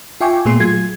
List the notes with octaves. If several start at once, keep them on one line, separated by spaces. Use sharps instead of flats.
F4 E5 G5 G#5 C#6 D6
A#2 A3 B3 G#4 C6 C7
F#3 F4 G#4 G#6